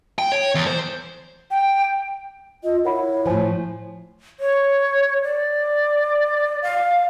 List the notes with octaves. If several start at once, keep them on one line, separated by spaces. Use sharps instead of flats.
G5
C#5
E2
C5
G5
F4 D#5
E4 A#4 C#5 F#5 B5
A2 F3 C5 G#5
C#5
D5
F5